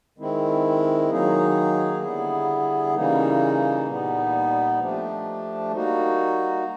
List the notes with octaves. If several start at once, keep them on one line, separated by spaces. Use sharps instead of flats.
D#3 G#3 C4 E4
D#3 F#3 A#3 D#4 G#4
D3 G3 B3 E4 G#4
C#3 E3 G3 A#3 D#4
A#2 G3 B3 D#4
F3 A3 D4 G4
G3 A#3 D#4 F#4